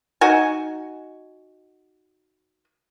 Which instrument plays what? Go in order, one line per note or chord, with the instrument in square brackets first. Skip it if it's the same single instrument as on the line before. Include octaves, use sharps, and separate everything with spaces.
[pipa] D#4 F#4 G#5